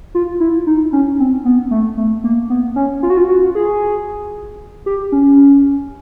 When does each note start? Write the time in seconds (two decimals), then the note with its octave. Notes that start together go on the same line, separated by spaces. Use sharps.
0.15 F4
0.40 E4
0.67 D#4
0.93 C#4
1.20 C4
1.45 B3
1.71 A3
1.97 A3
2.24 A#3
2.50 B3
2.76 C#4
3.03 F4
3.10 F#4
3.17 F4
3.29 F#4
3.55 G#4
4.86 G4
5.12 C#4